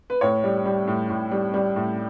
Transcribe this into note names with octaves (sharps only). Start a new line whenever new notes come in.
B4
A2 C#5
G3
G3
A2
A2
G3
G3
A2